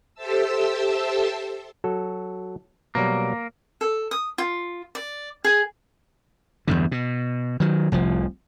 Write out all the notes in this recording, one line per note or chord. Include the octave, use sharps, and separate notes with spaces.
G4 A4 C5 E5 A5 E6
F#3 F#4 A4
B2 F#3 G3 A#3
A4
D#6
F4
D5
G#4
E2 G2 D3
B2
D#3 F#3
F1 C2 F3